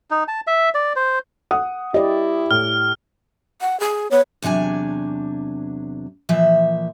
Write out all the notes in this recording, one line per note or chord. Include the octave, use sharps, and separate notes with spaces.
D#4
A5
E5
D5
C5
F#5 D#6
E4 G4 D5 D#5
A2 F6
F#5
G#4
B3 C#5
E2 C3 F#3 D4 G#5
A#2 E3 F3 E5